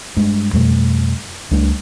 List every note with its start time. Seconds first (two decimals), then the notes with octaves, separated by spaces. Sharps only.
0.17 G2 G#3
0.53 F2 B2 G3 A3
1.51 C#2 G3 A3 D4